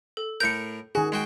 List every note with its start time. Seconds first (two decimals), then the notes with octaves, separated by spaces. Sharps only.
0.17 A4
0.40 A2 A#4 G6 C#7
0.95 D#3 F#4 G#4
1.12 G#3 F#4 G5